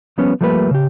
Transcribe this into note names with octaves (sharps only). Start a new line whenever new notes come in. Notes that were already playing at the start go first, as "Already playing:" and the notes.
F3 G3 B3 C#4
F3 G3 A3 A#3 B4
C#3 G4